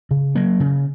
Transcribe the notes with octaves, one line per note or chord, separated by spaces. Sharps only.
C#3
F#3 A#3
C#3